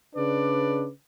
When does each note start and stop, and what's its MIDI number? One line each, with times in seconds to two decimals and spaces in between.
0.15 0.87 49
0.15 0.87 62
0.15 0.87 71
0.15 0.87 74